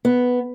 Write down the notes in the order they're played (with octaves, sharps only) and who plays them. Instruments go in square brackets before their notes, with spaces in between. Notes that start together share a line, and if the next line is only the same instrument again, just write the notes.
[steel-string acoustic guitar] B3